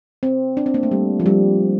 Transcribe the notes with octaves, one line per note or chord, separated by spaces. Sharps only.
C4
D4
C4
A#3
A3
G3
F3
G3